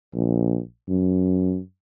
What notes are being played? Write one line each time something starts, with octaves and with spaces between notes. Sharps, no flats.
A#1
F#2